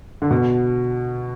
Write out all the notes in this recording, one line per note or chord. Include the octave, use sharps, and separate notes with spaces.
D3
B2